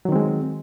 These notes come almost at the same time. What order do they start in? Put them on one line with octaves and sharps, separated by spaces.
F#3 D#3 C4 G#3